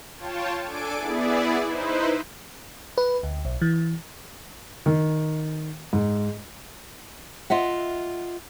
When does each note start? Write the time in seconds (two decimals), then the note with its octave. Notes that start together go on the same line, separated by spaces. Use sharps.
0.17 F4 C#5 G5 A5
0.64 D4 A4 G#5 D6 D7
0.97 B3 E4 G#4 D5
1.64 D#4 E4 B4 C5
2.98 B4
3.23 D2
3.45 B1
3.61 E3
4.86 D#3
5.93 G#2
7.50 F4 D#5 E5 F#5